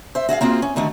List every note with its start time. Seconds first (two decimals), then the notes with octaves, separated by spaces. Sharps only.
0.15 C5 E5
0.29 F#4 G#4 E5 F5
0.41 A#3 C4 F4 F#4 G#4
0.62 C#4
0.76 D3 D#3 A3 F#4